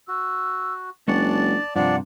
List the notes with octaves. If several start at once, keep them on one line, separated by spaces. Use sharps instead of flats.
F#4 E6
F#1 G#3 D4 F#4 D5 F#5 A5
G2 C3 F3 D4 D5 F#5